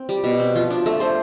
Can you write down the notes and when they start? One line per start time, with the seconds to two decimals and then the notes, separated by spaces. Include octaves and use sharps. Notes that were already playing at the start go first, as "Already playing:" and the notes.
Already playing: C4
0.09 G3
0.24 B2
0.39 C4
0.55 F3 F4
0.70 D4
0.86 A3 A4
1.00 A3 C5